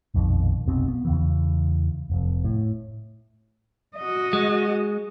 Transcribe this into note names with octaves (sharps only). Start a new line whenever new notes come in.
A#1 F2 B2 D#3
F1 B1 B2 C4
B3
E2 C#3 E3
F1 F2
A2
F#4 D#5
G#3